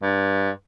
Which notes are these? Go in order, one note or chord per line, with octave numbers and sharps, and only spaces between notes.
G2